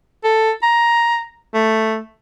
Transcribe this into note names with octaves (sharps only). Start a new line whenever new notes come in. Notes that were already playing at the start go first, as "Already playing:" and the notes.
A4
A#5
A3